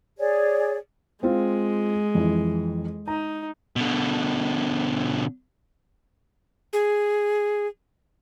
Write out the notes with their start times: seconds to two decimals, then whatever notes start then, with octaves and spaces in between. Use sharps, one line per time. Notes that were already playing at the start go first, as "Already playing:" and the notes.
0.19 G#4 C#5 D5
1.23 G#3 C4 F4
2.15 F2 E3
3.08 D#4 A#5
3.76 B2 D3
6.73 G#4